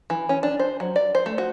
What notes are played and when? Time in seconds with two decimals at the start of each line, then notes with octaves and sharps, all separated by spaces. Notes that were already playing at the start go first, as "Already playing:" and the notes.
0.10 E3
0.29 C#4
0.43 D4
0.60 C5
0.80 F#3
0.96 D5
1.15 C5
1.26 A3
1.38 F#4